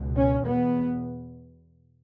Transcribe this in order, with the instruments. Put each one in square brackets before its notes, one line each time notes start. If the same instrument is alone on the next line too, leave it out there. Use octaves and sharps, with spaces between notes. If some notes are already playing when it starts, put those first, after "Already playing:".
Already playing: [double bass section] C#2 B2
C#4
E2 B2 B3